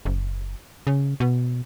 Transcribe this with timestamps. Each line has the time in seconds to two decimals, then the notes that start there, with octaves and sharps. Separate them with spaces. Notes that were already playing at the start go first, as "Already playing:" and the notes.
0.05 F#1
0.87 C#3
1.20 B2